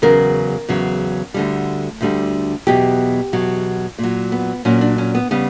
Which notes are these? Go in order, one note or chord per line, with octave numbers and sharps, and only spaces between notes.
E2 C#3 F#3 A#4
E2 C#3 F#3
D2 D3 G3
D2 D3 G3
E2 B2 F#3 G4
E2 B2 F#3
A#2 F#3
B3
A#2 F#3 C#4
D4
C#4
B3
C#3 G3 B3